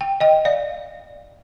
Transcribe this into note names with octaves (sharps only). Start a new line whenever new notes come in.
G5
D#5 G5
D5 F5